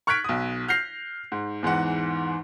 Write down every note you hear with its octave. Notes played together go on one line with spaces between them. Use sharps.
C#6 F6 F#6 G#6 B6 D7
B1 D#6
F6 G6 A#6 C7 F7
G#2
E2 G#2 E3 F#5